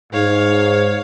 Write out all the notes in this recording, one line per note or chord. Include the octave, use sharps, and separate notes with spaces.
G#2 C#5 F5